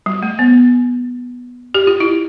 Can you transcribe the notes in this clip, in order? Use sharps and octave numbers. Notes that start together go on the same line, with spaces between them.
G3
A3
B3
G4
F4
E4